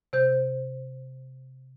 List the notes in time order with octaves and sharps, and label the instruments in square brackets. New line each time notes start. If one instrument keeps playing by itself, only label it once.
[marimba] C3 C5 G6